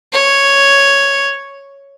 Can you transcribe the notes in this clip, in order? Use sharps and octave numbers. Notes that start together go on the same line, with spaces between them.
C#5